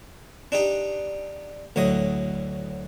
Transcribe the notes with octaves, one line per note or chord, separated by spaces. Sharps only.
D4 D#4 G4
D2 A2 F#3 D#5 D#6